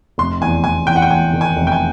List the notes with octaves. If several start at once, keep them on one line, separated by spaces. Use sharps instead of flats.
F1 C6
E2 G#5
E2 G#5
E2 G5
F#5
G5
E2 G#5
D#3
G#5
F1
G5
G#5